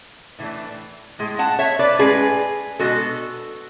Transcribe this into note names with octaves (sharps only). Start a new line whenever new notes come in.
A2 E3 A3 D4
A2 G#3
F#5 A5
C#5 E5
B4 D5
A2 G#3 C#4 G#4 B4
B2 G#3 B3 D4 F#4 A4